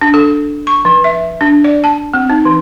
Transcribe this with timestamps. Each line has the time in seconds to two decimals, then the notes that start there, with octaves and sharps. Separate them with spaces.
0.01 D4
0.14 A4
0.67 C#6
0.85 F3
1.04 E5
1.41 D4
1.64 D5
1.84 A5
2.14 C4
2.30 D#4
2.45 E3